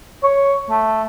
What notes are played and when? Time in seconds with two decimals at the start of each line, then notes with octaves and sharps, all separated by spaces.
0.23 C#5
0.70 A3